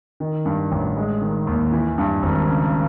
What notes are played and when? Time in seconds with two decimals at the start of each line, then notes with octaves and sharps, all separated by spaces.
0.20 D#3
0.45 G2
0.71 A1
0.97 G#3
1.21 D#3
1.47 D#2
1.72 E3
1.98 G2
2.23 G#1
2.49 C#3